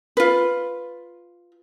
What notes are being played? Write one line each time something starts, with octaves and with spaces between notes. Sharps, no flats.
F4 B4